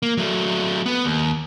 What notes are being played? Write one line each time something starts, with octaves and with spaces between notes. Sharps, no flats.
A#3
F#3 A3
B3
D#2